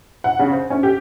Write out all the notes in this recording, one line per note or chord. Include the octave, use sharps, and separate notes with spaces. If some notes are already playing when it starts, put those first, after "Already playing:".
F#5
C#3
C5
C#4
G4